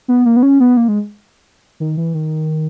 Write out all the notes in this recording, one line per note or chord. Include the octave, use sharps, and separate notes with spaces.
B3
A#3
B3
C#4
B3
A#3
G#3
D#3
E3
D#3